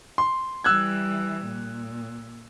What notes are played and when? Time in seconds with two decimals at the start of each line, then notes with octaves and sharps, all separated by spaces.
0.18 C6
0.64 E3 G3 E6 F#6 G#6
1.45 A#2